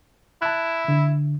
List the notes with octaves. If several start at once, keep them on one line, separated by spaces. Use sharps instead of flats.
E4 A5 F#6
D3